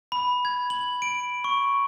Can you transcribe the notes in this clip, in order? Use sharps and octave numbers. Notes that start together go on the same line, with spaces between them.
B5
G#6
F#7
D7
C#6